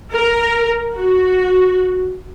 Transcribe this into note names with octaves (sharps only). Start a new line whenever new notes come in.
A#4
F#4